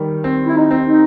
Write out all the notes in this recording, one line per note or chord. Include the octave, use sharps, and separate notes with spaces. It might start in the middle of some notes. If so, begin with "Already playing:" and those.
Already playing: D#3 G3
C4
E4
D#4
C4
D#4